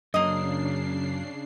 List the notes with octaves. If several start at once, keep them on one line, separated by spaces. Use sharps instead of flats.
F#2 C#3 F#3 A#3 D4 D#5 C7